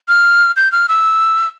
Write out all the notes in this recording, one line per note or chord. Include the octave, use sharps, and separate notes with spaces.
F6
G6
F6
E6